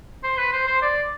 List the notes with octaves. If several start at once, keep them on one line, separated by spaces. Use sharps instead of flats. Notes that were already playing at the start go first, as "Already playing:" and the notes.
C5
B4
C5
C5
D5